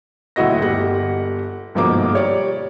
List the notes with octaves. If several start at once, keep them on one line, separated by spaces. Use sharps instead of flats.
D#1 D2 E4 F#4 D#5 A#6
G1 G3 F#5
G1 G#2 B2 F3 A#3 D6
G3 C#5 D5